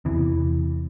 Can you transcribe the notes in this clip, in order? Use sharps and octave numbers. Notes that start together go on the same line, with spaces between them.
E2 C3 E3